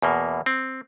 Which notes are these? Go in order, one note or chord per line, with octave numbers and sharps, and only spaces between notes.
E2 B2 A#3
C4